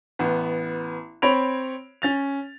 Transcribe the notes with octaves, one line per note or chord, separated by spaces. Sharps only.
A1 B3
C4 C#5 B5 D7 F7
C#4 A6 F7